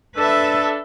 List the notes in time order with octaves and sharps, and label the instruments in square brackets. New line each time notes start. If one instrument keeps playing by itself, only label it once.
[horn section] D4 A4 [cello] B4 E5